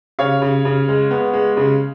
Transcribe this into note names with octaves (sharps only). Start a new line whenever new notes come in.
C#3 C#5 F5
C#3
C#3
G#3
B3
G#3
C#3